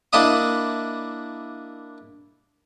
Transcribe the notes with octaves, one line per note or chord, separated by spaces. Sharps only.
A#3 D4 E4 D#5 D#6